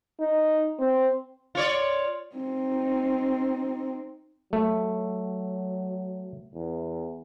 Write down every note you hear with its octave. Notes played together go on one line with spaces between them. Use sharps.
D#4
C4
F4 C#5 D5
C4 D#4
F#3 A3
E2